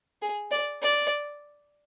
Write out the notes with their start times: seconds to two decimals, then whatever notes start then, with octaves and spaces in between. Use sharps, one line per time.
0.22 G#4
0.51 D5
0.82 D5